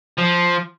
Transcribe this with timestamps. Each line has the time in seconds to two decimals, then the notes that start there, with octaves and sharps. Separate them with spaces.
0.18 F3